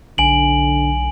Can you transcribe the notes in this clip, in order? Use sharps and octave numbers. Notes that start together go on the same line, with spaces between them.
B1 D3 G#5 D7 F#7